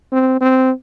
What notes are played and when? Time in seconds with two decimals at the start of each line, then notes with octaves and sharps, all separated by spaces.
0.12 C4
0.41 C4